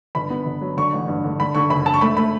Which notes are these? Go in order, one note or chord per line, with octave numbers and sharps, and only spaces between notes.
G1 B5
B3
G1
F#3
D3 C#6
A1
G2
D3
D3 B5
D3 C#6
F#1 B5
D3 A5
C#6
A3 B5
A3 B5